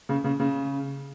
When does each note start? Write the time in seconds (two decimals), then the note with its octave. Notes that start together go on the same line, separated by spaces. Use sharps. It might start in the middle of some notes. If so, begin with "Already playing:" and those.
0.09 C#3
0.24 C#3
0.40 C#3